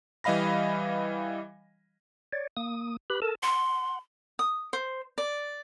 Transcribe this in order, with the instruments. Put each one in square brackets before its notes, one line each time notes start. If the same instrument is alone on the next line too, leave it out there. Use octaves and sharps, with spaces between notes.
[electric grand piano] E3 G3 D#5 F5 B5 A#6
[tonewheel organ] C#5 D5
A#3 D#6
G4 B4 B5
A4 A#4 A5
[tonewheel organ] F#5 [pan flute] C6
[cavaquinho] D#6
C5
D5